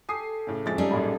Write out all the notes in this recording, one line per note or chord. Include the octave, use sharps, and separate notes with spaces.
G4 A4 G#5 D#6 C7
A2 C#3
F2 G#3 E5 A6
G3 C#4 D#4 G#4 A4 D#5
A1 F#2 A#2 B5